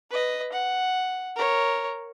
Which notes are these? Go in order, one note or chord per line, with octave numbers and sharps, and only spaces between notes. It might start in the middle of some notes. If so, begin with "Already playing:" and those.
B4 D#5
F#5
A#4 C#5